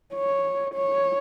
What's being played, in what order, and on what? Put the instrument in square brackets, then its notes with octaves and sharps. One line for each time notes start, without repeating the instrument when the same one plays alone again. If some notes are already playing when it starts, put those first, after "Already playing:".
[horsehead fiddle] C#5
C#5